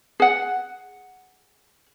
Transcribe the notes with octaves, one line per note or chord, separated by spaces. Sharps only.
G#4 F#5